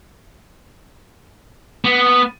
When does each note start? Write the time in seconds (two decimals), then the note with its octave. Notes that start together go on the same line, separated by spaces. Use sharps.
1.85 B3